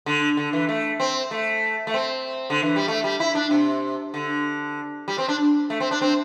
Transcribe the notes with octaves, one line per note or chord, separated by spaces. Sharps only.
D3
D3
E3
A3
C4
A3
A3
C4
D3
E3
G3
A3
G3
E4
D4
C3
D3
G3
C4
D4
A3
C4
D4
C4